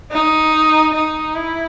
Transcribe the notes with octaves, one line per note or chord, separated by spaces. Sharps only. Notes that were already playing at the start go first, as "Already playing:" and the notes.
D#4
D#4
E4